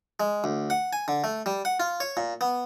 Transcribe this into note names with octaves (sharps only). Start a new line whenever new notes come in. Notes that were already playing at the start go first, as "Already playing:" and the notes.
G#3
D2
F#5
G#5
D3
A3
G3
F#5
F4
C#5
A#2
B3